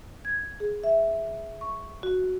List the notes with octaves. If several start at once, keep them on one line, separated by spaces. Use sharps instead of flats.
G#6
G#4
E5
C#6
F#4